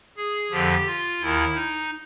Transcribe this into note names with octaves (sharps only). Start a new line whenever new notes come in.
G#4
F2 D3 F3 G4
F4
D#2 D#3 E4
D#4